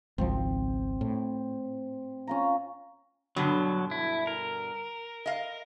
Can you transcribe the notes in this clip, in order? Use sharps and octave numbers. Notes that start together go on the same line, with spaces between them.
G#1 C#2 F3 C4
A2
C#4 F4 A#5
G2 B2 D3 F#3
E4
A#4
D#5 F5